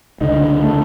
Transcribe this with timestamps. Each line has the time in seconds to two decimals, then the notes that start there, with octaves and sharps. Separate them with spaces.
0.21 C#2 D3 D#4
0.63 A3